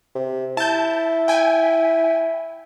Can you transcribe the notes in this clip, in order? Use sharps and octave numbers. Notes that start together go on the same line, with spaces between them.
C3
E4 A5 G6
G5 G#5